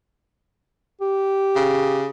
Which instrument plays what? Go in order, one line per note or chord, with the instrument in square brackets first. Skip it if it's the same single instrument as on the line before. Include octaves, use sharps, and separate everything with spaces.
[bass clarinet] G4
[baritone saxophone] C#3